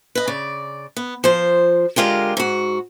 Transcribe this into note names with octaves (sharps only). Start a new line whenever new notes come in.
B4 D#5
C#3 D5
B3
F3 C5
D3 G#3 F4 G4 A#4
G#2 F#4